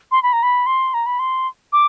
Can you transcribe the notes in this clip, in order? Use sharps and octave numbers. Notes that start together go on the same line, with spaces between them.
C6
B5
A#5
B5
C6
A#5
B5
C6
D6